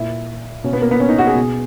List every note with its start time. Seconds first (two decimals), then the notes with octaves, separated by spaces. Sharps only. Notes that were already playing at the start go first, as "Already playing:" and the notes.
Already playing: A#2 E4
0.64 B2 C#4
0.73 B3
0.82 A#3
0.91 B3
1.00 C#4
1.09 D#4
1.18 F#4
1.27 G#4
1.35 B2